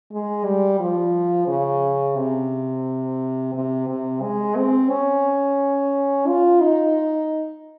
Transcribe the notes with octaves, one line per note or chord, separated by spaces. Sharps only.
G#3
G3
F3
C#3
C3
C3
C3
G#3
C4
C#4
F4
D#4